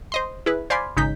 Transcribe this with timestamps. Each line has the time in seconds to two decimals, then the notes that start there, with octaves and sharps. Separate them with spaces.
0.12 C5 D#5 C6
0.46 E4 G#4 B4
0.70 C5 D5 F5 G#5 B5 C6
0.97 G#1 C#3 D#4 G6 B6